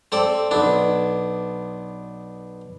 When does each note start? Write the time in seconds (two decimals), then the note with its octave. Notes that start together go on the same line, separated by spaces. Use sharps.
0.12 C4 A4 D5
0.51 B1 B3 D4